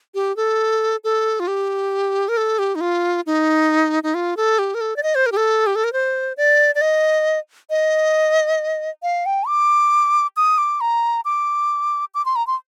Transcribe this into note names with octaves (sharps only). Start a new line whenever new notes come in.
G4
A4
A4
F4
G4
A#4
A4
G4
D#4
F4
D#4
D#4
F4
A4
G4
A#4
A4
D5
D#5
C5
A#4
G4
A4
G4
A4
A#4
C5
D5
D5
D#5
D#5
F5
G5
D6
D#6
D6
A#5
D6
D6
C6
A#5
C6